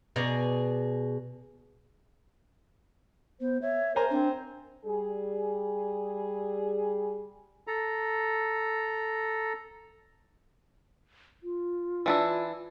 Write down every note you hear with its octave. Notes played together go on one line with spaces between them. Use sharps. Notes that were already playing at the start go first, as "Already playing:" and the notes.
B2 G#4 D5 A#5
B3 C5
C#5 E5
A#4 C5 G#5 A#5
C4 D4
G3 G#4
A4 A#5
F4
E3 D4 E4